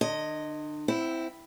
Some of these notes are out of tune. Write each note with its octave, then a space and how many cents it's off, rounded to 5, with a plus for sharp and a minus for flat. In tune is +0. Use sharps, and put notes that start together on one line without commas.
D3 +40 D#5 +0
C4 +0 E4 +0 F#5 +35